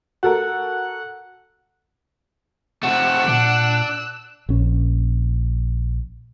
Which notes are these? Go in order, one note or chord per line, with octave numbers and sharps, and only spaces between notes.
F#4 A4 A#4 F#5
C3 A3 F#5 E6 F#6
A#2 D4
A#1 C#4